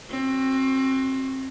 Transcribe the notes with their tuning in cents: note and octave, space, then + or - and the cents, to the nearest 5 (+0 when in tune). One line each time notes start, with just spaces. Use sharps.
C4 +25 F#4 +0